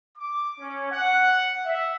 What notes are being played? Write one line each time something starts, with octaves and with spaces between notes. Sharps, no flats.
D6
C#4
F#5
E5